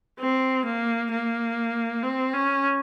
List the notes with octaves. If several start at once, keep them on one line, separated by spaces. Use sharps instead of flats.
C4
A#3
A#3
C4
C#4